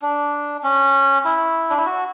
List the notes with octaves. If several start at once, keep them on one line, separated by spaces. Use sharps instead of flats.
D4
C#4
E4
D4
E4
F#4